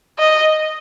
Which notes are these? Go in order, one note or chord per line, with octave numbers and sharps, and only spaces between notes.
D#5